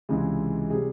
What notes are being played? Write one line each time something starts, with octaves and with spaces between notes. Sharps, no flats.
C#2 C3 E3 G#3 G#4
C3 G3 G#4